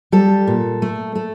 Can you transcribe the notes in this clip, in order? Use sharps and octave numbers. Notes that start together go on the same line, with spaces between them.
G3 A4
A#2
A3
A3